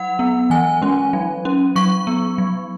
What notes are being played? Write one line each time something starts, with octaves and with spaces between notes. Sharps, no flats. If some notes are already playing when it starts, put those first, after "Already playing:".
Already playing: F#3 F#5
B3
E3 G#5
G#3 C#4
F#3
C#4
F#3 C#6
B3
F#3